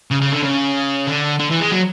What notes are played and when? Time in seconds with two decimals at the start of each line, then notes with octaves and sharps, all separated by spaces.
0.11 C#3
0.21 C#3
0.32 D3
0.43 C#3
1.07 D3
1.39 D3
1.50 E3
1.61 G#3
1.71 F#3